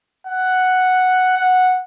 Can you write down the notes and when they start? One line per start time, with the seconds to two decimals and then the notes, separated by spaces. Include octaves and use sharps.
0.27 F#5
1.37 F#5